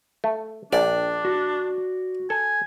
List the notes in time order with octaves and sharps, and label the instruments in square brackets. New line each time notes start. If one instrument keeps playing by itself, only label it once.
[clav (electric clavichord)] A3
[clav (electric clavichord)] A#1 [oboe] D4 [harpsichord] D5 [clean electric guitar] G5
[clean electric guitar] F#4
[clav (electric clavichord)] A4 [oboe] G#5